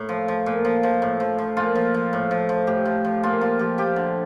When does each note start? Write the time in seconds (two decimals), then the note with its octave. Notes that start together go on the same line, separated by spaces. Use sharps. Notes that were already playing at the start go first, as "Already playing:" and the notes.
Already playing: A2
0.09 F3
0.28 F3
0.46 A#2
0.65 F3
0.83 F3
1.02 A2
1.20 F3
1.38 F3
1.57 A#2 F4
1.75 F3
1.94 F3
2.13 A2
2.31 F3
2.49 F3
2.67 A2 G4
2.85 F3
3.05 F3
3.23 A#2 F4
3.41 F3 F4
3.59 F3 G4
3.78 F3 G4
3.96 D3